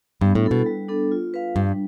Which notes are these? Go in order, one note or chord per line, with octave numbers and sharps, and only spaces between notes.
G2 B3
A2
E4 A4
B2
G3
B3 D4 A4
F4
B4 F5
G2 G3